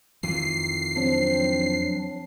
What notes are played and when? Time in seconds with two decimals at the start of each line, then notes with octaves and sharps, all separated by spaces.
0.23 F2 D#3 E3 C7
0.97 F3 F#3 C4 D4